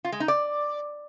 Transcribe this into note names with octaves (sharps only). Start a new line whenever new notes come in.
F4
G#3
D#4
D5